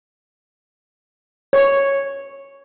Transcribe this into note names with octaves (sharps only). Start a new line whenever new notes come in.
C#5